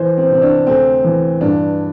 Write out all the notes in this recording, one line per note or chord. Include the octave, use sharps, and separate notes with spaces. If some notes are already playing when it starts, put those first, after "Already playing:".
Already playing: E3 C5
C4
C3 C4
D4
D2 C4
E3
G2 D4